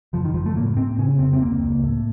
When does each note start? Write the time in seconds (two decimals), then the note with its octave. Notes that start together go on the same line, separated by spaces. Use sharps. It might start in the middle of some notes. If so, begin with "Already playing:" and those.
0.13 F#1 F3
0.24 D#3
0.34 F#1 F3
0.46 A3
0.56 A2 A#3
0.77 A2 C4
0.98 C#3 C#4
1.19 F1 C4
1.33 C4
1.41 C#2 A#3
1.62 C#2
1.84 A2